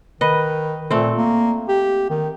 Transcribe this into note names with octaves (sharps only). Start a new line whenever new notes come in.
D#3 B4 D#5
A#2 A3 C4
A#3
G4
D#3